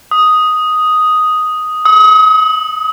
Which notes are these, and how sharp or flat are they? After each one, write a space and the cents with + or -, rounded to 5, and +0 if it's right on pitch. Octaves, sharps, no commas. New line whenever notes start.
D#6 +5
D#6 +40